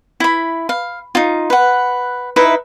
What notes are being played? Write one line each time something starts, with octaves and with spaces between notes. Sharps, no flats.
E4 B5
F5
D#4 F4
B4 F#5
D#4 E4 B4 E5